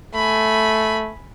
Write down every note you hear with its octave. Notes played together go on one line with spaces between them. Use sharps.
A3 G#5 B5